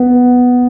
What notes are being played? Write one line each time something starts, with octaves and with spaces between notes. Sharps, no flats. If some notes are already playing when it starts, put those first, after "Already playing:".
Already playing: B3